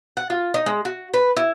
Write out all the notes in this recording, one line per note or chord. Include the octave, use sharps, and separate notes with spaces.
F#5
F4
D#4
G#3
F#4
B4
E4